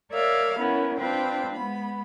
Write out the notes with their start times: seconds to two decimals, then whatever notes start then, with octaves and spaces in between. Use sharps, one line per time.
0.11 A#4 C#5 D5 E5 F5
0.58 B3 C#4 E4 A#4
0.98 C4 D4 F4 B4 C5 G5
1.56 G#3 B3 B5